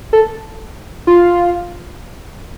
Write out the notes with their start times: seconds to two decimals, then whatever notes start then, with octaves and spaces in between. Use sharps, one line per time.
0.13 A4
1.07 F4